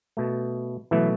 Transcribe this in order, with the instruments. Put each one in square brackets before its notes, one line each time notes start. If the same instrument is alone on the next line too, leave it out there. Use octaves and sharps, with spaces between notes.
[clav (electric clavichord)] B2 A3
B2 E3 F#3 A3 E4